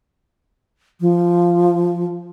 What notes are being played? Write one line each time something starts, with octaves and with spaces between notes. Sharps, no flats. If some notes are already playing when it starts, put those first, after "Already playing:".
F3